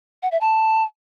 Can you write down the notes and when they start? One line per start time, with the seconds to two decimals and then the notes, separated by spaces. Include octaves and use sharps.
0.23 F#5
0.32 E5
0.41 A5